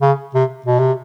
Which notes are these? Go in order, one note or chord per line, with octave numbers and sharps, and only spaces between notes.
C#3
C3
B2
C3